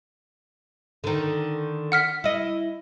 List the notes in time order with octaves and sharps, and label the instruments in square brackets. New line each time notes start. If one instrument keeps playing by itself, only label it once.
[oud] D3 D#3
[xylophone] F#5 F6 B6
[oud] E4 D#5